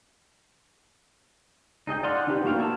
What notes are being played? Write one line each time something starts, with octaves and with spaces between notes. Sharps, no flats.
D#4 G#4 D#5 G5
D5 D#5 F5 F#5 C6
F#5
D4 D#4 G4 B4
A#3 F#4 F5 G5
E4 G#4 C#5 A5 E6